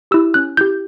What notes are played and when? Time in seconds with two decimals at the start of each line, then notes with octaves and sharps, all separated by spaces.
0.11 E4 G4 E6
0.34 C#4 F#6
0.57 E4 G4 G6